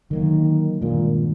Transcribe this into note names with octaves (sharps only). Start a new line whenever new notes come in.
D3 D#3 F#3 A#3
G2 A#2 D#3 G#3